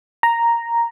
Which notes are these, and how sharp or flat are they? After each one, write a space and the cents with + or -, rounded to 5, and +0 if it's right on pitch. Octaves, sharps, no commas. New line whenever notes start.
A#5 +0